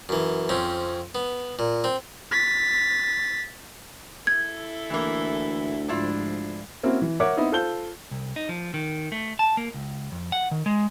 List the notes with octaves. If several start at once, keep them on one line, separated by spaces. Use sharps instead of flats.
F#2 E3
F2 C4 C#4
B3
A#2
C4
A6 B6
E4 A4 G#6
D2 E3 A#3
G#2 F3 D4 E4 F4
A#3 C4 C#4 E4 F#4
E3
A#4 C#5 E5 F#5 D6
B3 C4 D#4 E4
F4 A4 C5 G6 G7
C2
D#4
F3
D#3
A3
A5
A#3
C#2
F2
F#5
D#3
G#3